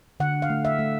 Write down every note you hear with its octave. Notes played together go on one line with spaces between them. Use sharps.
D3 F#5
F5
A3
E5
A3